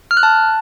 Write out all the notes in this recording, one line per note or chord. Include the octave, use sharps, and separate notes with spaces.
F6
F#6
A5